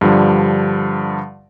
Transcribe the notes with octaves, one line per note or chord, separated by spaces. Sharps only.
G2 D3 F3 G3